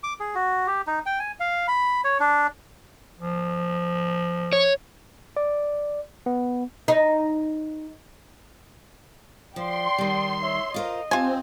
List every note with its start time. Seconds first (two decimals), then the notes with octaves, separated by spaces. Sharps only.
0.03 D6
0.20 G#4
0.35 F#4
0.67 G4
0.87 D#4
1.06 G5
1.19 G#5
1.40 F5
1.68 B5
2.04 C#5
2.20 D4
3.19 F3
4.53 C#5
5.37 D5
6.26 B3
6.88 D#4
9.56 F3 D5 G5 C6
9.98 D#3 G3
10.41 C#5 E5
10.74 F4 A#4 C5 D#5
11.11 C4 F4 G4 G#5 A5